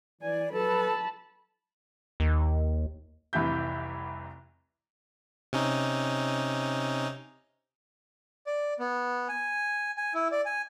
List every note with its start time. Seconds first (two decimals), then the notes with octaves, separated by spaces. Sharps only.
0.22 E3 D5 G#5
0.53 F#3 A4 B4 A5 B5
2.20 D#2
3.33 F1 C2 E3 G4 E5 G6
5.53 C3 C#4 D#4
8.47 D5
8.80 B3
9.29 G#5
9.97 G#5
10.14 E4
10.32 D5
10.46 G#5